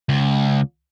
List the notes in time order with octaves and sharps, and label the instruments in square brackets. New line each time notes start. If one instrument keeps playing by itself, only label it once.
[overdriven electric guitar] C#2